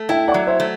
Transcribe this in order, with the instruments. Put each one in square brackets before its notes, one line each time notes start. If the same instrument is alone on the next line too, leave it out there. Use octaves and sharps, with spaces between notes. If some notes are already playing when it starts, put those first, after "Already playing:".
Already playing: [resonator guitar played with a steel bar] A3
[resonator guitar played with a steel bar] E4 [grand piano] E5 G5
[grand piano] D5 F#5
[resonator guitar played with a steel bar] F#3
[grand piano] C5 E5
[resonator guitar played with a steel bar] A3